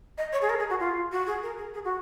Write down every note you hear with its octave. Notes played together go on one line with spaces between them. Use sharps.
D#5
C#5
G#4
A#4
G#4
F#4
F4
F#4
G#4
A#4
G#4
G#4
F#4